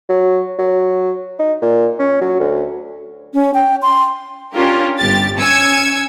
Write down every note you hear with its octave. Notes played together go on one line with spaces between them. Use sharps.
F#3
F#3
D#4
A#2
C#4
F#3
D2
C#4
G5
C6
C#4 D4 F4 G4 A#4
G1 G4 A6
C#4 G#5 E6 G#6 C#7